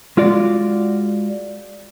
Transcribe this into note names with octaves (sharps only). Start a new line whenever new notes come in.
G#3 F4 F#4 D5